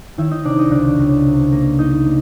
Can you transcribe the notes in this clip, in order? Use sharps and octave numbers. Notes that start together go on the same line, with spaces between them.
D#3 E4 E5
D#4 D#5
C3 D4 D5
D#4 D#5
C#2 D4 D5
C#2
C3
A#3
A#3 D#4 D#5
A#3